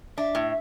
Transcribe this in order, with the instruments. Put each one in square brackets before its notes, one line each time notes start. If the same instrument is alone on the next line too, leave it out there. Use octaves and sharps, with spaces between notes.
[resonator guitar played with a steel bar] D4 [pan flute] E5
[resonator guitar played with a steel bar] A2